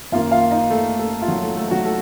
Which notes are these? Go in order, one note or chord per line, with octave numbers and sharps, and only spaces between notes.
F#2 D#3 A#3 F4 F5
F4 F5
D#4 D#5
A3 A4
A3 A4
F4
F#3 F#4
A3 A4
A3 A4
A4
F#3 F#4
A3 A4